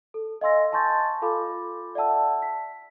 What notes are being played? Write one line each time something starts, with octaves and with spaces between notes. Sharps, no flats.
A4
D#5 F5 G#5 C6 E6 A#6
G#5 A5 C6 C#6 G6 A6
F4 A4 F5 B5 D6
D5 E5 F#5 A5 E6
B6